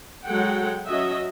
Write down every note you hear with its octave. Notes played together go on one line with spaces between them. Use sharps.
F#3 G#3 A4 F#5 G5
F#3 C#4 F#4 D#5 E5